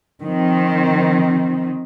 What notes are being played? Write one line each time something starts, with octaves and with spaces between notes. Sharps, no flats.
D#3 F3 C4